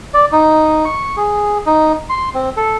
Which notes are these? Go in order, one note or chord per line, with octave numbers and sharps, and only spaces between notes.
D5
D#4
C#6
G#4
D#4
C6
C4
A4